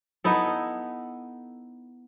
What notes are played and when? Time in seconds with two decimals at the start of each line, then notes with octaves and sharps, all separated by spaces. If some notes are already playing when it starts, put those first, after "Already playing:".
0.24 B3 D#4 E4 A4